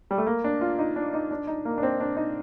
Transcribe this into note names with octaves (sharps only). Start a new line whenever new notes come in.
G3
A3
A#3
D4
F4
D#4
D4
D#4
D4
D#4
A#3
D4
C4
D4
D#4